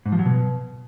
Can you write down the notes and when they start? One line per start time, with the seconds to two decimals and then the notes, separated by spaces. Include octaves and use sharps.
0.06 G#2
0.12 F3
0.19 F#3
0.26 B2